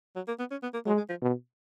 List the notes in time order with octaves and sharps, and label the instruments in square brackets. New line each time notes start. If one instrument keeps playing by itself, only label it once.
[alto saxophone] F#3
A#3
B3
C#4
B3
A#3
[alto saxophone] F#3 [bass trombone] G#3
[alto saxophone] G#3
F3
[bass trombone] B2